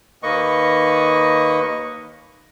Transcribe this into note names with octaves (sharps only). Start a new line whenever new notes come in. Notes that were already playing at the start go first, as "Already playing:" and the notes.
D#2 D#3 A#3 B4 D#5 C#6